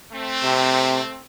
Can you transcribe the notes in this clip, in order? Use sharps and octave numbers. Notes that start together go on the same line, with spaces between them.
A3 C4
C3